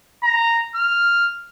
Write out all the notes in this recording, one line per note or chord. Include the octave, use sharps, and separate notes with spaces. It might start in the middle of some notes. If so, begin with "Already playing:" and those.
A#5
F6